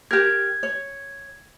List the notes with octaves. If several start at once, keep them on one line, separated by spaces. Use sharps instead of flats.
G4 A#4 G#6
C#5